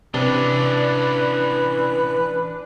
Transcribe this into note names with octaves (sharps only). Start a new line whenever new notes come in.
C3 E3 C#4 D4 B4